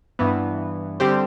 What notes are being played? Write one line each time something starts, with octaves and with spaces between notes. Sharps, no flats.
G2 E3 B3
D3 G3 C4 G4 C5